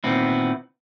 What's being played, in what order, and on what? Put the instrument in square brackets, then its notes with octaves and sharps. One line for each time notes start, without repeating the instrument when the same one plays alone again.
[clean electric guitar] A#2 D#3 B3 C4 E4